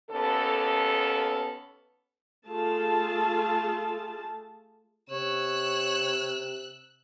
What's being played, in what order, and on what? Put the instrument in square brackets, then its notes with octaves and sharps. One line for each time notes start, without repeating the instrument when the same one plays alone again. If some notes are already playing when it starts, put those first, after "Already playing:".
[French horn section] D#2 B3 C#4 A4
[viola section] A3 F4 G#4 A4 A5
[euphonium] C3 [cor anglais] C#5 [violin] E6 F#6